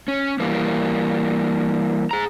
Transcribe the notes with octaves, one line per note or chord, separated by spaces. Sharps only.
C#4
E3 G3 A#3
G#4 A#5